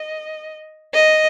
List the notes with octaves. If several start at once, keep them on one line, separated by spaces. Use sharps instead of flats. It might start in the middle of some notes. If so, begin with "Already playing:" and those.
Already playing: D#5
D#5